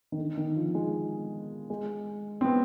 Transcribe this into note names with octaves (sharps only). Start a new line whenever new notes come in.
D#3
D3
D#3
F3
G#3
G#3
C4
B3